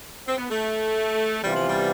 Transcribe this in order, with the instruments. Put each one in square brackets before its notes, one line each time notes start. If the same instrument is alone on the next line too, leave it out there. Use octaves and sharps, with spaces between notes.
[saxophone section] C4
B3
A3
[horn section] C3 E3 B3 F4 [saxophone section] G3
[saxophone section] F3
G3